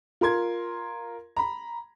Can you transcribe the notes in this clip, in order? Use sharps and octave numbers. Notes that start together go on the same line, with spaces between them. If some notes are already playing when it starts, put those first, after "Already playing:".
F4 A#4 C6 G#6
A#5 B5